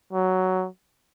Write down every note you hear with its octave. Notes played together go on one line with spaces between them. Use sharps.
F#3